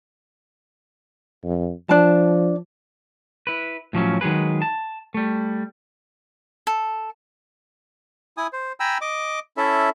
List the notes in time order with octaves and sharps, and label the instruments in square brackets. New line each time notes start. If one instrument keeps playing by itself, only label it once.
[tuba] F2
[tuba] F3 [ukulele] D4 A5
[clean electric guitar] E4 B4
A2 F3 F#3 C#4
D#3 F#3 G#3 G#4 B4
A5
G3 A3
[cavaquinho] A4
[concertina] E4 G#5 D#6
C5
G5 G#5 A#5 B5 E6
D#5 D6
C#4 E4 A4 E5